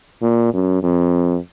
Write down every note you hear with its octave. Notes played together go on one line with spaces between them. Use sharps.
A#2
F#2
F2